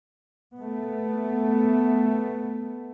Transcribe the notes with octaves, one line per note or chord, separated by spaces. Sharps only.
A3 B3